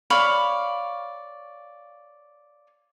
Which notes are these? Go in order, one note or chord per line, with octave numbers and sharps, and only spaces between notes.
C#5 D5 F5 B5